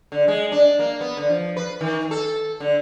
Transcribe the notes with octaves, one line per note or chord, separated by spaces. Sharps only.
D3
G#3
D4
A#3
B3
D3
F3
B4
D#3
A4
D3